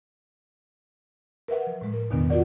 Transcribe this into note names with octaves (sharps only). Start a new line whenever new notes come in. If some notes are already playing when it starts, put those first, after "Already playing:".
A#4 B4 E5 F#5
F3
A2 G#3
A#4
E2 B2 D3 D#3 B3 D4
F4 F#4 A#4 D5 F#5